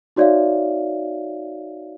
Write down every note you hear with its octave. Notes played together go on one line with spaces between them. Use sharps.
D#4 F#4 C#5 D5 E5 F5